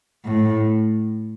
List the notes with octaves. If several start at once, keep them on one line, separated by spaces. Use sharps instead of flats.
A2